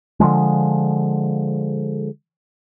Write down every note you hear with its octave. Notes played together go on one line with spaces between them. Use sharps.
D3 E3 F3 G#3